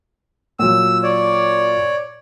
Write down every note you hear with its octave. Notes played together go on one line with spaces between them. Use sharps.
A#2 F#3 E6
C#5 D5